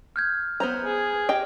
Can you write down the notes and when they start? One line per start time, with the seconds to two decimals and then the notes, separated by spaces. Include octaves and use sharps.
0.16 F6 G6 G#6
0.60 B3 C5 A#5
0.85 G#4
1.29 G4 D#5 G5